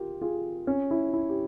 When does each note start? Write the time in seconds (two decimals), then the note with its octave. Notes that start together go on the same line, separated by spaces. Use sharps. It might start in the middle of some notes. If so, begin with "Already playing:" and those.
Already playing: F4 G4 A#4
0.21 F4 G#4
0.67 C#4
0.91 E4
1.13 E4
1.29 G4